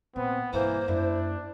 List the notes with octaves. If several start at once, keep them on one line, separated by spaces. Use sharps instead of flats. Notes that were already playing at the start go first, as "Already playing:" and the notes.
A#2 B3 C4
G2 B2 E3 A#3 C5
F#2 A#3 D4 E4